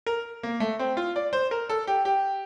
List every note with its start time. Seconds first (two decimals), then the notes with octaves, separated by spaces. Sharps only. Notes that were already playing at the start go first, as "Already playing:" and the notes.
0.07 A#4
0.43 A#3
0.60 A3
0.79 C4
0.97 F4
1.16 D5
1.33 C5
1.51 A#4
1.69 A4
1.87 G4
2.05 G4